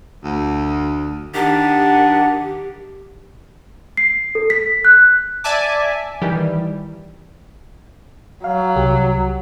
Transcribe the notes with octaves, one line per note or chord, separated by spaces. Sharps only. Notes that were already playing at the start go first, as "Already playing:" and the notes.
D2
D#3 D4 G4 F#5
C7
A4
B6
F#6
D5 E5 G#5 A5 D6
D#3 E3 G3
F#3 F5
C2 G4